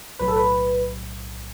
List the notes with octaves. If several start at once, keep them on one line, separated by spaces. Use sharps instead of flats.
B1 A2 F#3 B4
A4
B4